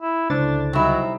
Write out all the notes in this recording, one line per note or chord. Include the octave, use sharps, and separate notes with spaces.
E4
C#2 D3 D4 E4 A4 C5 A6
C3 F#3 G3 C4 D#4 E4